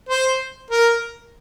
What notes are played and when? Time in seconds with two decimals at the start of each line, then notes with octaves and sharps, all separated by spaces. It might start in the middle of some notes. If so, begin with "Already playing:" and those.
0.09 C5
0.71 A#4